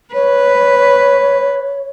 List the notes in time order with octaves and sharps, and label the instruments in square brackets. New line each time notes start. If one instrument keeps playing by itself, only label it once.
[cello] B4 [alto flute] C#5